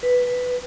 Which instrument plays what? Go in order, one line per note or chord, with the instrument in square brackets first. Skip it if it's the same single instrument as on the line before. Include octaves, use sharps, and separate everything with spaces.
[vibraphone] B4